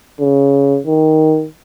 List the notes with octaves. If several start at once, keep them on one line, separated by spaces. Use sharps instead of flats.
C#3
D#3